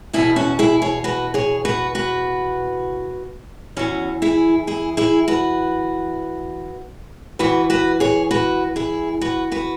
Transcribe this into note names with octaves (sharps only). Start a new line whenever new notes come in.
E2 B2 E4 G#4
C#4 F#4
E4 G#4
G#4 C#5
F#4 B4
G#4 C#5
F#4 B4
F#4 B4
E2 E3 C#4 F#4
E4 G#4
E4 G#4
E4 G#4
F#4 B4
E2 E3 F#4 B4
F#4 B4
G#4 C#5
F#4 B4
E4 G#4
F#4 B4
F#4 B4